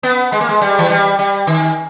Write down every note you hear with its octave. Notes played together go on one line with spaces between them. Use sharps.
B3
G#3
A#3
G#3
G3
E3
G3
G3
D#3